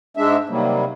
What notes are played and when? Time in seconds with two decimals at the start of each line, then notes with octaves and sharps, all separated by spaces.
0.17 G#2 G#3 D4 E5
0.49 C3 D#3 F#3 G3 A#3